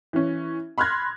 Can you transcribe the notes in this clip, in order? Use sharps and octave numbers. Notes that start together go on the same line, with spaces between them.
E3 C#4
B5 C6 F6 F#6 G#6 A#6